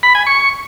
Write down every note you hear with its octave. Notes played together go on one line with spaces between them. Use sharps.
B5
G#5
C#6